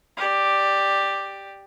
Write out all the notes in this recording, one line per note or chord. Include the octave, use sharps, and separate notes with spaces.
G4 D5